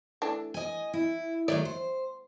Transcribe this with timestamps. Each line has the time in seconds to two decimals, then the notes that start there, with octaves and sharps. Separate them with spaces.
0.22 E3 A3 D4
0.54 D#5 G#5
0.94 E4
1.48 D#3 F#3 A3 C#5 D5 E5
1.65 C5